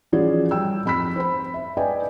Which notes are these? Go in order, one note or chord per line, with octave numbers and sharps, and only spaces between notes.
E3 F3 C#4 F#4 G#4 D5
G3 G5 E6
F2 C4 B5 E6 B6
C5 B5
E5
B4 D5 D#5 G5 G#5